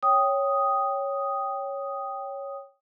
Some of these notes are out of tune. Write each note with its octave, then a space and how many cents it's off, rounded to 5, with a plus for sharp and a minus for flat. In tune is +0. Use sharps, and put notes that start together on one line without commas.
C#5 +0 G5 +0 D#6 +0